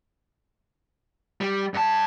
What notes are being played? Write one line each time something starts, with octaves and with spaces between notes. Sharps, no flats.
G3
G2 A5